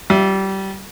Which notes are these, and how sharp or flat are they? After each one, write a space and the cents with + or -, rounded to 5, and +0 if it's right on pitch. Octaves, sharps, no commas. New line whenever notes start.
G3 -25 F4 -5 E5 +0